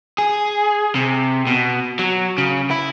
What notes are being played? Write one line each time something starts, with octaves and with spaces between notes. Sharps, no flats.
G#4
C3
B2
F#3
C#3
E4